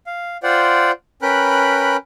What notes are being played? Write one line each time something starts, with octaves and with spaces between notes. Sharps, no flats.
F5
F4 C5 D5 F#5 G5
C#4 A#4 B4 G5 B5 F#6